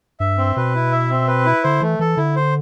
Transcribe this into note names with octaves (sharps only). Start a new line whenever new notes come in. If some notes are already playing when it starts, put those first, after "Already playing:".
G2 E5
C4
B2 B4
E4
E5
C4
B4
E4
D3 C5
E3 A3
E3 A4
D3 E4
C5